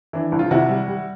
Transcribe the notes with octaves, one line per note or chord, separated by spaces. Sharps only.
E3 D4 E4
C2
F4
C3 E4 F#4
G3
G3